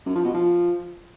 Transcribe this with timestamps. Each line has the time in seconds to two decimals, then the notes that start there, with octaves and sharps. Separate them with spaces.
0.06 F#2
0.15 F3
0.25 B2
0.34 F3